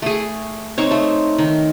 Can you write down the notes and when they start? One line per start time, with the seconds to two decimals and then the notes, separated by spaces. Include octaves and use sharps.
0.02 A3 G#4
0.78 C4 D#4 C#5
0.91 A3
1.38 D#3